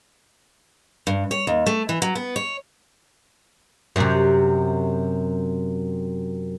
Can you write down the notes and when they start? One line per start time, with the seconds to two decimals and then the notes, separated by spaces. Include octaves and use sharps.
1.07 G2
1.31 C#5
1.47 D#2
1.66 A3
1.89 E3
2.02 F#3
2.15 B3
2.36 C#5
3.96 F#2 C3